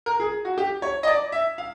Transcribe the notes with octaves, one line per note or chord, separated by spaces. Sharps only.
A#4
G#4
F#4
G4
C#5
D#5
D5
E5
F5